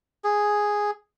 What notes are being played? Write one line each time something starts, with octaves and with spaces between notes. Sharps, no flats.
G#4